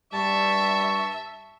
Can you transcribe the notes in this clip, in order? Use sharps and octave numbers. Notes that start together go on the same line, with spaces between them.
G2 G3 E5 A5 C#6